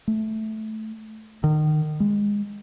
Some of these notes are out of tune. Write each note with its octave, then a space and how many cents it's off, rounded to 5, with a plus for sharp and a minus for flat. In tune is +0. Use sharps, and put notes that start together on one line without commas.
A3 -10
D#3 -30
G#3 -20